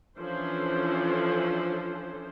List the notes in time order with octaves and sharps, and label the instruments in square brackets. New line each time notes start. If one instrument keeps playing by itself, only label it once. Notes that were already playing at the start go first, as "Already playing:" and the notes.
[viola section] E3 F3 C#4 D4 A4 C5